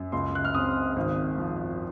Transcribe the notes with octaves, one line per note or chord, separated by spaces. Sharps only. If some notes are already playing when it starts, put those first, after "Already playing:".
Already playing: F#2
C#2 C6
F#6
F6
C4 D#6
G#1
F3